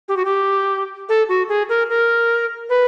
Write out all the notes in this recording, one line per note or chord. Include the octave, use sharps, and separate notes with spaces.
G4
F#4
G4
A4
F#4
G#4
A#4
A#4
B4